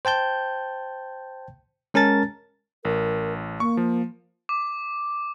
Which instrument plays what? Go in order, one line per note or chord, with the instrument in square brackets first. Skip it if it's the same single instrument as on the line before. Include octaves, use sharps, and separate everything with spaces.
[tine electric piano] C5 G5 A5 G6
G#3 C#4 A#4 A5 A6
[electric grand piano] A1 [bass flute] A#4
[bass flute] A#3 [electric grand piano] C#6
[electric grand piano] F3
[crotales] D6